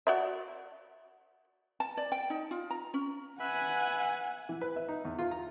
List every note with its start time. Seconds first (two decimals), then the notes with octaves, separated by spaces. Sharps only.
0.07 F#4 D5 E5
1.80 A5
1.97 D5
2.12 G5
2.30 D#4
2.51 F4
2.71 A#5
2.94 C#4
3.40 B4 E5 F#5 G#5 B5
4.49 E3
4.61 B4
4.76 E5
4.89 D#4
5.05 E2
5.19 F4
5.31 A#5